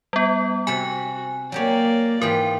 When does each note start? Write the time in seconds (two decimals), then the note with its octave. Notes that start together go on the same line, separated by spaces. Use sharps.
0.13 G3 B3
0.67 C3 F#4 A4 G#5 B5
1.52 F#3 A#3 G4 C#5 D5
2.22 G#2 E3 F4 G4 A#4